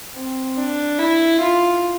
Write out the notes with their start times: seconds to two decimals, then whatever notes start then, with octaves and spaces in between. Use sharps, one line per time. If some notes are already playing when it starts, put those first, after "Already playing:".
0.16 C4
0.57 D4
0.99 E4
1.40 F4